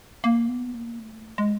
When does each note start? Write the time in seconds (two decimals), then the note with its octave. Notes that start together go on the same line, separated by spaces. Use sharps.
0.24 A#3
0.49 B3
0.75 A#3
1.00 A3
1.38 G#3